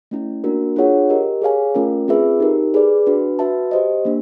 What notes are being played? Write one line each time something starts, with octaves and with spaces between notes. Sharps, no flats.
A3 C#4 E4
A#3 D4 F#4 A#4
D4 F4 G#4 C#5 F#5
G4 A#4 D#5
G#4 C#5 F5 G#5
A3 C#4 F4 A#4
C4 F4 G#4 B4 E5
D#4 G4 A#4
G#4 B4 D5
D4 F#4 B4
F#4 B4 E5 A5
G4 C5 D#5
A#3 D4